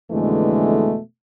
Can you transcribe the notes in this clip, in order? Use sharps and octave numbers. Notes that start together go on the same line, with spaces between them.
F2 B2 D3 E3 G#3 A3